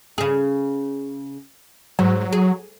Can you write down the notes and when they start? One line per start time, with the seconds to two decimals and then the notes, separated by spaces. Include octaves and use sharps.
0.18 C#3 G#4
1.99 G#2 F#3
2.33 G#4